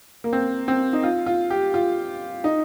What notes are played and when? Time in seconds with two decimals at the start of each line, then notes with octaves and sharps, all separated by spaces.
0.24 A#3
0.33 C4
0.68 C4
0.93 D#4
1.03 F4
1.26 F4
1.50 G4
1.74 F4
2.44 D#4